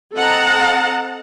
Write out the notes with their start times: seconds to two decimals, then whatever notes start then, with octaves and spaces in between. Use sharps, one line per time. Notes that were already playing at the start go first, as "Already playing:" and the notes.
0.14 C4 A4 D#5 F#5 A5 A#5